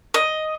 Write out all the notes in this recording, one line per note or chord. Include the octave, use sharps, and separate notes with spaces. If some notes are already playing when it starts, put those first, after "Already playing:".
D#5